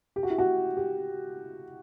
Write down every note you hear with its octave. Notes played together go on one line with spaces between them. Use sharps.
G4
F#4
E4
F#4
G4